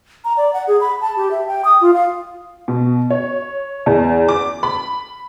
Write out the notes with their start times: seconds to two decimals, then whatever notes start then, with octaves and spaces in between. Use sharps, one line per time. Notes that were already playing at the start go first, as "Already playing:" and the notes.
0.25 A#5
0.37 D5
0.53 F#5
0.67 G#4
0.81 B5
1.01 A5
1.17 G4
1.31 E5
1.48 G5
1.65 D#6
1.81 F4
1.93 F5
2.68 B2
3.10 C#5
3.86 E2
4.28 D6
4.63 B5